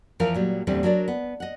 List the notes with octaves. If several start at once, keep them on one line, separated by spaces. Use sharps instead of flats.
E2 E3 F3 A#4 F5
A#2 F#3 G3
E2 A#2 D3 G3 A3 C4
F#3 D4 A#4 D5
B3
D#5 F#5